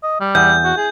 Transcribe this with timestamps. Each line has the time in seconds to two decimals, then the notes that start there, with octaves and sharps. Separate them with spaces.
0.03 D#5
0.20 G3
0.35 E2 G6
0.64 F#4
0.77 G#4